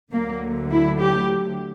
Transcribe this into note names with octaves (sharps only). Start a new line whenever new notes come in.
D2 D3 F#3 A#3
E4
G4